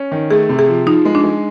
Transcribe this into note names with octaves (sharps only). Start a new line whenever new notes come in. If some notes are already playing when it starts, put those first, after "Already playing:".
Already playing: C#4
D#3
A3 G#4
C3
G#4
F3
F3 D#4
G#3
D4
G#3